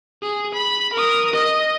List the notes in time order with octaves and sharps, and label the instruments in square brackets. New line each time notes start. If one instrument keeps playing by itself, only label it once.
[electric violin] G#4
B5
A#4 D#6
D#5